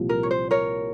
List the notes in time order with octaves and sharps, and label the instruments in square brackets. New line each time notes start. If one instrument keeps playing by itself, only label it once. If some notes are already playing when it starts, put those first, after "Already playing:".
Already playing: [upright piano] C2 A#2 F3
[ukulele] A#4
C#5
C5
A#4 C#5